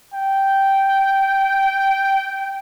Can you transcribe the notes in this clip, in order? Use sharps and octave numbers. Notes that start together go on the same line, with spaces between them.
G5